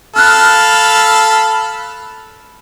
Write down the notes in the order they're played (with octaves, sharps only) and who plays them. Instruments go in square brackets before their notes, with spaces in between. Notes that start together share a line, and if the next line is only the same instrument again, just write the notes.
[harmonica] A4 F5 B5 [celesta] F6 F#6